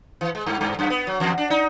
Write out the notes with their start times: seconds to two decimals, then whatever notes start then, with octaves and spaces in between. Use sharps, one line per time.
0.21 E3
0.35 G#3
0.46 G2
0.61 G2
0.79 F#2
0.90 B3
1.07 F#3
1.20 E2
1.38 D4
1.50 D#4